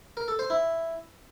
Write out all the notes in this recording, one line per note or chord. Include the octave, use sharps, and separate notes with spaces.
A#4
A4
C5
E4